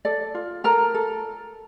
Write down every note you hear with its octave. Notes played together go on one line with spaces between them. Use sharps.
A4 D5
F4
A4 A#4 A#5
A4